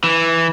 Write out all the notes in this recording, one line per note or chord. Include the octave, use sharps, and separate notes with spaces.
E3